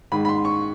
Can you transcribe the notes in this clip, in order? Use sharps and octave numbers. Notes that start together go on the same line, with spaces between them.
G#2 D#3 B5
B5
C6
C#6